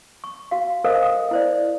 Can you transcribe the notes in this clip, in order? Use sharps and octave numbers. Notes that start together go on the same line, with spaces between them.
C#6
F#4 F5
A4 A#4 C5 D#5 F5
G5 D#6
E4 C5 D5